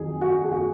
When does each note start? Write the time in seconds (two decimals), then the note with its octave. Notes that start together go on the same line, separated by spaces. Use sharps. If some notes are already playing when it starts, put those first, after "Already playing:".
Already playing: F2 D#3 F#3 G#4
0.21 F#4
0.44 G#4
0.52 F#4